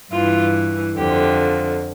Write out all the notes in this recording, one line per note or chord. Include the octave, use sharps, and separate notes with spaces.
G2 E3 F4
F2 D3 F3 G4